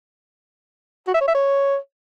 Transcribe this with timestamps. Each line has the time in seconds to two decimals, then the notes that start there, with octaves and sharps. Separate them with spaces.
1.07 F#4
1.14 E5
1.21 C#5
1.28 E5
1.35 C#5